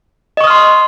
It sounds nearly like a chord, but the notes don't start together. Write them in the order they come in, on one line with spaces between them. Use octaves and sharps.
D#5 C#6 D#6 F6 C6